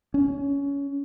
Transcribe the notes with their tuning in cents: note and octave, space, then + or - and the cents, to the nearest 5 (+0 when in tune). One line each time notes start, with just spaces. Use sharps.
C#4 +20